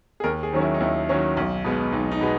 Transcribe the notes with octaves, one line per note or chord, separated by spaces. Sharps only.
G#4
D#2 A#4
G#4
D#3 F#3 C#4
E4
D#4
D#2 E4
D#3 F#3 C#4
B1
B2 G#3 B3
B1 D#4
D#4
B2 G#3 B3